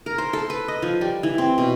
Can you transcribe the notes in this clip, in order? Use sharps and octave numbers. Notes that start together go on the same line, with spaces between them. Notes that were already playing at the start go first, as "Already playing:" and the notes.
A#4
C5
A4
B4
D#5
F3
G3
E3
C4
B2